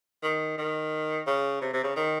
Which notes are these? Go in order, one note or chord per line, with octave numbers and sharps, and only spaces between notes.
D#3
D#3
C#3
C3
C3
C#3
D#3